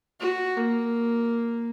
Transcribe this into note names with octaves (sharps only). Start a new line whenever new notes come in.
F#4
A#3